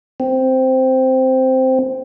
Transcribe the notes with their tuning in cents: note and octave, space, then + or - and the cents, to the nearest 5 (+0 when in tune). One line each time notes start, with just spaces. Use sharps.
C4 -5